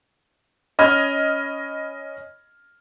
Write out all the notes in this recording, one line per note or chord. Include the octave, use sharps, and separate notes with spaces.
C#4 D#5 B5 F6 G#6